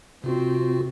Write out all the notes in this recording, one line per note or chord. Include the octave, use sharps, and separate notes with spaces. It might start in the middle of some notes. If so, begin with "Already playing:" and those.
C3 C4 F4 F#4